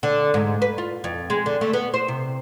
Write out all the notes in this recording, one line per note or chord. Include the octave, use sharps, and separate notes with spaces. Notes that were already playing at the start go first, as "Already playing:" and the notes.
D3
G#2
B4
F4
F2
G#3
D3
A3
B3
C5
C3